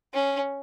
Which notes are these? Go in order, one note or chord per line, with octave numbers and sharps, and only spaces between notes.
C#4